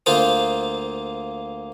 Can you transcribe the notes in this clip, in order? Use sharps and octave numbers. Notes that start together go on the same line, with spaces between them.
D2 A#3 F4 C5 F5 D#6